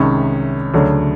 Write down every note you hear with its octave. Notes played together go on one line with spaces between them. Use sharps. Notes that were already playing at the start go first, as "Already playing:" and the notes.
Already playing: C2 C3 D#3 G#3 C#4
D2 C#3 F#3 A3 D4